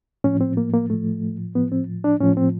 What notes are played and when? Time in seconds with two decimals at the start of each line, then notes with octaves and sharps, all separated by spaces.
0.24 A2 F3 C#4
0.41 C4
0.57 A#3
0.73 A#3
0.90 A2 F3 A3
1.55 A2 F3 B3
1.72 C4
2.04 D4
2.20 A2 F3 C#4
2.37 C4